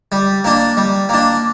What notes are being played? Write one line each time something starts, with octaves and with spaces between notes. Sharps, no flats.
G3
A#3 D4
G3
A#3 D4